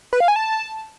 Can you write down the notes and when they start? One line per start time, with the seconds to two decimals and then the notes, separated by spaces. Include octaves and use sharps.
0.13 B4
0.20 F5
0.28 G#5
0.36 A5